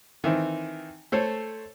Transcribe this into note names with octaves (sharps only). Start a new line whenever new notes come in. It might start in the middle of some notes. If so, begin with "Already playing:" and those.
D#3 E3 C4
A3 A4 C5 C#5